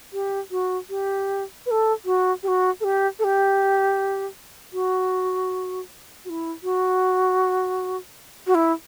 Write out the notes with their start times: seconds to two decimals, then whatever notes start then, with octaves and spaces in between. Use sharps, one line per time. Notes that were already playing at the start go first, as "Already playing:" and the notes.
0.13 G4
0.51 F#4
0.90 G4
1.66 B4
1.71 A4
2.05 F#4
2.43 G4
2.48 F#4
2.81 A4
2.84 G4
3.19 A4
3.24 G4
4.73 F#4
6.25 F#4
6.30 E4
6.63 F#4
8.47 F#4
8.55 E4